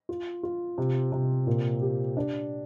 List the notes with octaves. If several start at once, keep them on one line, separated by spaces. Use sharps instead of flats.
F4
F4
C3
C3
A#2
G4
D4